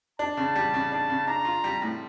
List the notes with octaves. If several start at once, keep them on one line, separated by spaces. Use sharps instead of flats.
D4 A5
C#3
G3
C#3
D4
C#3
D4 A#5
F4
G3
A2